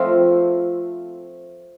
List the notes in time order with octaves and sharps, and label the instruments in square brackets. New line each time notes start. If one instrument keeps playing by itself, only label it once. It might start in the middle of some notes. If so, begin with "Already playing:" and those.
Already playing: [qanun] F3 A3 C4 F4